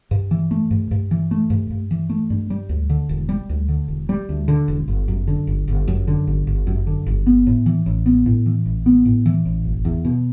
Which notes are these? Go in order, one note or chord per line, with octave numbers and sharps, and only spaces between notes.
G2
E3
A3
G2
G2
E3
A3
G2
G2
E3
A3
G2
G3
D2
D3
E1
G3
D2
D3
E1
G3
D2
D3
E1
G1
F#2
D3
G1
G1
F#2
D3
G1
G1
F#2
D3
G1
B3
A2
E3
A1
B3
A2
E3
A1
B3
A2
E3
A1
F#1
E2
B2